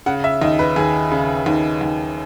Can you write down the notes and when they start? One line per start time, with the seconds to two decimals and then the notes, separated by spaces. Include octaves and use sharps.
0.06 C#3 F#5
0.24 E5
0.41 D#2 D#5
0.59 B4
0.76 D#2 G#4
1.11 C#3
1.46 D#2
1.81 D#2